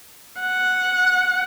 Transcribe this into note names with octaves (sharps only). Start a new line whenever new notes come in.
F#5